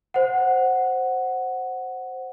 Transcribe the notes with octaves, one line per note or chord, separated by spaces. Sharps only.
C5 F#5